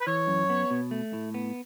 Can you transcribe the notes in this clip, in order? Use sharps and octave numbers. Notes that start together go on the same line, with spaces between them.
B4
E3 C#5
F#2
B3
B2
A3
A2
B3